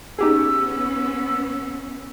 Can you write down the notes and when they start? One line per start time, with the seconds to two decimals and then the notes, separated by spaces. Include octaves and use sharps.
0.19 B3 C#4 D#4 G4 G#4 E6